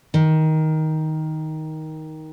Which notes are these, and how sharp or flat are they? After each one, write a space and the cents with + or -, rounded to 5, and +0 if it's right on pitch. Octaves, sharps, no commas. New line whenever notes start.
D#3 +10